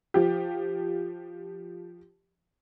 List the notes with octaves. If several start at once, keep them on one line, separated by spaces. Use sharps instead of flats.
F3 G4